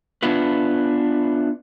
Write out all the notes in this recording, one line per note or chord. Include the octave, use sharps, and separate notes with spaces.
B3 D4 E4 F4 B4